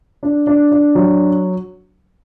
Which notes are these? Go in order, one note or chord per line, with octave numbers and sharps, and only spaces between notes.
D4
D4
D4
F#3